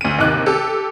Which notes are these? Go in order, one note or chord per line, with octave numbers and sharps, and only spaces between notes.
D2 D#7
D#2 C3 D#4 D6 F#6
G4 A4